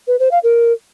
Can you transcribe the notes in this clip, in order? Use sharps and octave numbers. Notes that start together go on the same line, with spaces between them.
B4
C5
F5
A#4